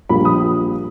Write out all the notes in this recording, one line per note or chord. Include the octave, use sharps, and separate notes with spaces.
A#1 A#2 G3 A#3 B5
D#6